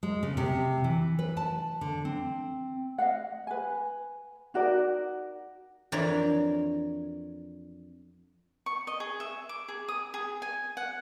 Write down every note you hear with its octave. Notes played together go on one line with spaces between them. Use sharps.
G#3
C#3
C3
E3
B4
A5
D3
C4
D#5 F5 F#5
B4 G#5
D#4 F#4 A#4 D5
F2 E3 D4 A#4 C#5 A#5
C#6
D#5
G#4
E5
D6
G#4
D#6
G#4
G#5
F#5